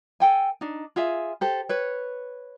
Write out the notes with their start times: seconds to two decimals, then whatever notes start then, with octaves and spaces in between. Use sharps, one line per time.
0.20 A4 G5 G#5
0.61 D4 D#4
0.96 F4 G#4 E5 G#5
1.41 G4 A4 C5
1.69 B4 C#5